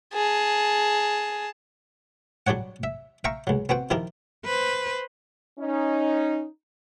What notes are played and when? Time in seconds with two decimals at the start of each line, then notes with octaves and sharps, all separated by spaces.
0.13 G#4 A5
2.47 F#3 G3 D4 C#5 F#5
2.83 E5
3.24 E5 F5 G5 A#5 C#6
3.47 C#2 F#3
3.69 B3 C4 F#4 G5
3.90 D#3 F3 E4 G4 A#4
4.45 B4 C5
5.59 C#4 D#4